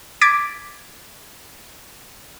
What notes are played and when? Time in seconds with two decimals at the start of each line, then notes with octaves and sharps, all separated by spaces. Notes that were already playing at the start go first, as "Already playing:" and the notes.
0.21 D6 G#6 A6 B6 D7